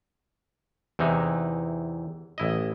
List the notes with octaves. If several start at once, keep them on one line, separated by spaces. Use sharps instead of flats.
E2 C3 E3 D#4
A1 E4 D#5